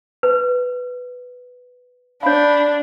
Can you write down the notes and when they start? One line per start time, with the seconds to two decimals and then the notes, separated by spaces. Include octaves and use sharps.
0.23 B4
2.23 D4 C#5 F5 B5